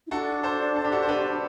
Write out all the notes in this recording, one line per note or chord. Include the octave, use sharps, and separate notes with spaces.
E4
D4 F#4 A4
A4 C5
A4
G4
F#4 A4
C5
G4 B4